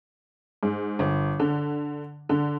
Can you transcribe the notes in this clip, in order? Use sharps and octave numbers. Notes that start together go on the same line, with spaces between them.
G#2
G1
D3
D3